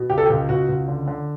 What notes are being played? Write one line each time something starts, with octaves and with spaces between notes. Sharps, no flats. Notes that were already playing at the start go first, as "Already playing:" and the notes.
Already playing: B2
C#2 G4
A4
G4
C#2
C#2 F#4
C#2
D3
D3